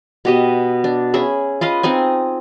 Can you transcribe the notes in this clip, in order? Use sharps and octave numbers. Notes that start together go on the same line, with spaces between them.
B2 G4 D#5
D4
C#4 G#4 E5 B5
F4 B4 D#5 F5
C4 D#4 D#5 G#5